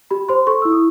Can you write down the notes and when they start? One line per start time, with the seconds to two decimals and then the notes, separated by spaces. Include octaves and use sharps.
0.11 G4 B5
0.29 C5 C6
0.47 A4 C#6
0.62 E4 E6
0.72 D#6